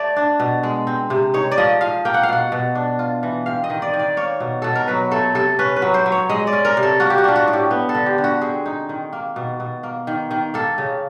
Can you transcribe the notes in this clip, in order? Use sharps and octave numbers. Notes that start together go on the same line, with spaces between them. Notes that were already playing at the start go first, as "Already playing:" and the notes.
Already playing: A3 D5
D4
B2
G#3
C4
C3
D#4 C#5
D5
F3 D#5
F3 F5
A#3 G5
F#5
F5
B2 F#5
B2
D4
F4
E3
C4 F5
D#5
D#3
D5
D#3
D5
A#3 C#5
B2
B2 A4
A#4
F#3 B4
A3 A4
C3 A4
C#4 B4
B4
F#3
C5
F#3
C#5
G#3 D#5
D5
C#4
A#4
C3
A4
A#3 F#4
G4
F#4
D4 F4
F#4
A2
G4
B3
A4
D3
G4
D3
F#4
C4 G#4
D#4
D#3
A#3
B2
B2
A#3
D#3
D#3
A#3 A4
C#3